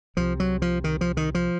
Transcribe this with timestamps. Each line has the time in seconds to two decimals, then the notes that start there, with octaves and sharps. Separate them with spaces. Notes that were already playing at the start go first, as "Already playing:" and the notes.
0.16 C2 C3 F3
0.40 F#3
0.62 F3
0.84 D#3
1.01 F3
1.17 D#3
1.35 F3